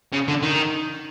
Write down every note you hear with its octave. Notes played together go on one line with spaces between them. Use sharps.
C#3
D3
D#3